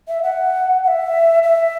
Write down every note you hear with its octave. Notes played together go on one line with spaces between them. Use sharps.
E5
F#5
F#5
E5
E5